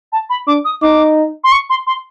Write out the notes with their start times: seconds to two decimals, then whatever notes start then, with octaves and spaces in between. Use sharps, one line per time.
0.12 A5
0.30 B5
0.47 D4 D6
0.65 D#6
0.82 D#4 D6
1.44 C6
1.52 C#6
1.70 C6
1.87 C6